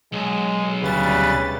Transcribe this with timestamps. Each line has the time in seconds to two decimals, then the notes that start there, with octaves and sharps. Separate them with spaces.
0.13 B1 G#3
0.83 D2 C#3 G3 B4 A6